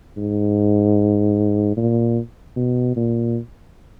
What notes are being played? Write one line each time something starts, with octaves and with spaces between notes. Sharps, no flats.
G#2
A#2
B2
A#2